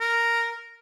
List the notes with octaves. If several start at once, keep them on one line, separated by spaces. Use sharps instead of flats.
A#4